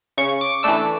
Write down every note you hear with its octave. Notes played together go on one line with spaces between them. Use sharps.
C#3 C#6
D6
E3 A3 D4 E6